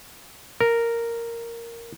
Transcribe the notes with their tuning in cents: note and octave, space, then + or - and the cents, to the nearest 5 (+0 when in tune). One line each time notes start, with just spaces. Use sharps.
A#4 -5